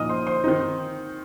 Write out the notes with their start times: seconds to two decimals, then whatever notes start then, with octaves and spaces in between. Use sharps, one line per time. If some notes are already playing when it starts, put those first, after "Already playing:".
Already playing: A#2 F3 D#4 D#5 D#6 F6
0.09 C5 C6
0.27 C5 C6
0.44 D#3 C4 D#4